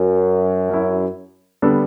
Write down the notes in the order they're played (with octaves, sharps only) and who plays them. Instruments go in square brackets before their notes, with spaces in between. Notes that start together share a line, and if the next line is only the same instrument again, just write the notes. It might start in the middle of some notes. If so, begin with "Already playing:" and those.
Already playing: [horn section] F#2
[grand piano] F#3 C#4 E4
D3 G3 B3 D4 A4